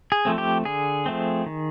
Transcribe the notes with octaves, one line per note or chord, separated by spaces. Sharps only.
G#4
F3 A3 C4
G4
D3 G#4
F3 A3 C4
D#3